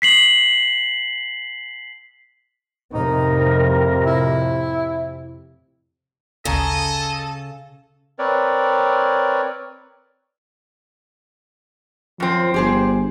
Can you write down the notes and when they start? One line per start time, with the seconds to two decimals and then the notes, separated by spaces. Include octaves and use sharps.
0.02 B6 C7 F#7
2.94 F2 A2 C3 D#4 A#4
4.06 E4
6.45 G#1 D2 C#3 A4 D#5 A#5
8.19 C4 A#4 B4 C#5 D5
12.20 F#2 F3 C4
12.54 G1 G4 G#4 C5